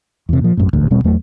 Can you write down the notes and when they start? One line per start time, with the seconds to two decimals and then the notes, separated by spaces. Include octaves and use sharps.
0.29 E2 C3
0.41 A#2 F3
0.57 A#1 F#2 A2
0.73 D#1 A1 D2
0.90 D#1 B2 G3 C4
1.04 E2 F#3 A3